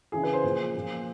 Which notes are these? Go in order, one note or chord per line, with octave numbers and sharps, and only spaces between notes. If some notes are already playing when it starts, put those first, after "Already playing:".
C#3 E3 G#4
B4
C5
A#2 F3
A#2 F3